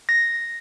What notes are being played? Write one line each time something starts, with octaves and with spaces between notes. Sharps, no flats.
A#6